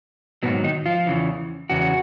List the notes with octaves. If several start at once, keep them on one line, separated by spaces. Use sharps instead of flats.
G#2 B2 D#3 F#3 B3
D#3 D#4
F3 F4
E2 C#3 E3
E2 C#3 F#4